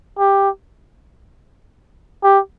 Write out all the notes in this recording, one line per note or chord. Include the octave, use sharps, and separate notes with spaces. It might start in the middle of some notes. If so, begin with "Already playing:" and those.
G4
G4